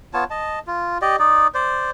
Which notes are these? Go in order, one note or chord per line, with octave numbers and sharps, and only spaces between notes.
B3 F4 C#5 A5
D#5 A5
F4
G4 D5 D#5
D#4 D5
C5 D5